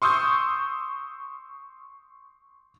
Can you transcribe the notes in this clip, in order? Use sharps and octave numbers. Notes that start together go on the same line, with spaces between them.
C6 C#6 D#6 E6 G6